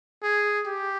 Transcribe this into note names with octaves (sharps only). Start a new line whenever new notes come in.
G#4
G4